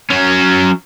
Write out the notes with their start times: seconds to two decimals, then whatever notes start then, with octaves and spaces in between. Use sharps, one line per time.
0.11 F#3 C#4